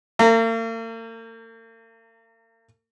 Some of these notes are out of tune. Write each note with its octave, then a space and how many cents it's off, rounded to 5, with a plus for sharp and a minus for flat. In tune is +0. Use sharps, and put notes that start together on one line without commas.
A#3 -45 A#5 -30